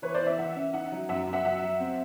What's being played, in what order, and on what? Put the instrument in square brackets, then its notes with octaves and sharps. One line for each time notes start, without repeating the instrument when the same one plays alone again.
[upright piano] E3 [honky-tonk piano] B4 C#5
[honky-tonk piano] C5 D5
[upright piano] E3
[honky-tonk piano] D5 E5
[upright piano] E3 [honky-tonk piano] E5 F#5
[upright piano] C#4
[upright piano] D#4 [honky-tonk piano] E5 F#5
[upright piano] F#3
[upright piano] F#2 [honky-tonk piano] E5 F#5
[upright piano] F#2
[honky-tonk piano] E5 F#5
[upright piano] F#3 [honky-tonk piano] E5 F#5
[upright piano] F#3
C4